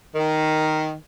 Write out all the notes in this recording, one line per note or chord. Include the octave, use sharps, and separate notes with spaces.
D#3